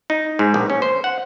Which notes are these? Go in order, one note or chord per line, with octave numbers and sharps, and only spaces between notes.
D#4
G#2
A#1
C#4
C5
F#5